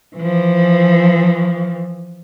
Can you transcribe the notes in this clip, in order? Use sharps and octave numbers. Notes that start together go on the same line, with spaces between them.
E3 F3